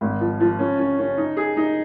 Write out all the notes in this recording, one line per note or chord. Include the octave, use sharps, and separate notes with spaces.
G#1
F3
F3
C#4
C#4
C#4
D#4
G#4
D#4